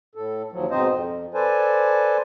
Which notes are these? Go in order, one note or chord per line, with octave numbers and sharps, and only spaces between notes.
A2 A4
D#2 F3 F#3
G#2 B2 C4 D#4 C5 D#5
F2
A4 B4 C5 D5 G#5 A5